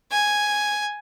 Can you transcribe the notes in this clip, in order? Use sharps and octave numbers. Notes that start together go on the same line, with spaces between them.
G#5